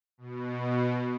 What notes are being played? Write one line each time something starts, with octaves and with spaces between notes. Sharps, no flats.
B2